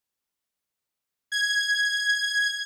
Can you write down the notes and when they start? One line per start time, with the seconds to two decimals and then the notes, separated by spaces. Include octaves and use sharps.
1.32 G#6